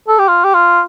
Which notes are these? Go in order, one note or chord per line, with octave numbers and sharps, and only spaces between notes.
A4
G4
F4
G4
F4